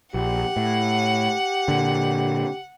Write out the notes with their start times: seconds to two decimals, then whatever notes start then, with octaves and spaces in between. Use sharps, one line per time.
0.14 A#1 G4 F#5
0.57 A2
1.68 A#2 D3